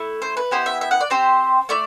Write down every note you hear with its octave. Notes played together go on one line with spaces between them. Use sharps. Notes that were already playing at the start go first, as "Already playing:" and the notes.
Already playing: A3 E4
C5
B4
B3 E4 G4 C5
E5
E5
F#5
D5
C4 G4 C5
A3 E4 D5